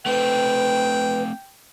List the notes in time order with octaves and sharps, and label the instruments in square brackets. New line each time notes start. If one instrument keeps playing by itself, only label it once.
[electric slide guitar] A3 C4 [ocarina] B4 [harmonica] G5